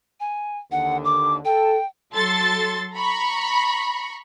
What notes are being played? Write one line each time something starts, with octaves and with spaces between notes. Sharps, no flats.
G#5
D#2 D3 F#5
D6
A4 G5
F#3 A4 C6 A6
A#5 B5 C#6